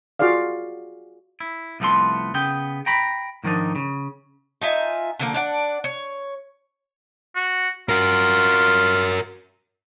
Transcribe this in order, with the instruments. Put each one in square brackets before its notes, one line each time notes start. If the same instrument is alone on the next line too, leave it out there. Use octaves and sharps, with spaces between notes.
[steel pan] F4 F#4 G#4 D5 F5
[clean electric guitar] E4
C2 F3 A3 B3 A4 C6
C#3 B3 G#4 G5
G5 A#5 B5
G#2 D#3 F3 D4 D#4
C#3
[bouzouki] D#4 F4 E5 G#5
D3 F3 A#3
D4 D5 F#5
C#5
[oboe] F#4
[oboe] F4 [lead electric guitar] F#4 A#4